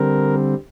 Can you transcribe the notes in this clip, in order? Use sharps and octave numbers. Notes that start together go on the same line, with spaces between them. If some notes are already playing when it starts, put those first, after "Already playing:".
Already playing: D3 G3 C4 A#4